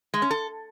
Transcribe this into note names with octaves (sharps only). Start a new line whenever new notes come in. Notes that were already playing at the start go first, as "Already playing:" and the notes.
G#3
C#4
A4